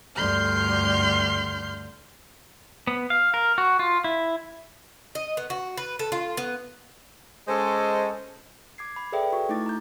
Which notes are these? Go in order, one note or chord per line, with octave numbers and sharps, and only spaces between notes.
D2 G2 D3 C6 F6 G6
B3
F5
A#4
F#4
F4
E4
D#5
B3
F#4
B4
A4
F4
B3
G#3 C#4 A4 C5 D#5
D6 G#6 C7
B5
G#4 A4 B4 D5 E5 G5
F#4 C#6
A3 D#4 E4 D6 A6
A#5 G6